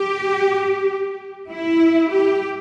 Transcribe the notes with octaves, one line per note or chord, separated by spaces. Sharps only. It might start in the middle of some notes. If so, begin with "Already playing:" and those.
Already playing: G4
E4
G4